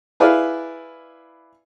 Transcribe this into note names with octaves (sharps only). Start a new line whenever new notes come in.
E4 G#4 B4 D5 F5